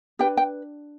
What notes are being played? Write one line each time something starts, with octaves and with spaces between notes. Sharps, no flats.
D4 G4 B4 G5
G5